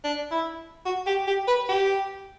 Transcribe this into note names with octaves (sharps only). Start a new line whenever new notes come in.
D4
E4
F#4
G4
G4
B4
G4